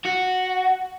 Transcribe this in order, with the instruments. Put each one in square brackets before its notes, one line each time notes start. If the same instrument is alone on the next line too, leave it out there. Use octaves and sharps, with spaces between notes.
[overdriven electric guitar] F#4